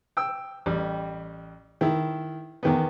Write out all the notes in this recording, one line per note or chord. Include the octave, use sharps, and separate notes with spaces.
G5 E6
A1 G3
D#3 E4
E2 D#3 B3